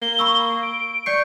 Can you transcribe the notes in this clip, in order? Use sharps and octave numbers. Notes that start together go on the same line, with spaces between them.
A#3 G7
B5 C#6 E6
D7
D5 C#6 G6 C7